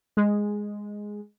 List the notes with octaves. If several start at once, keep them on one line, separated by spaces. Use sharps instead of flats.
G#3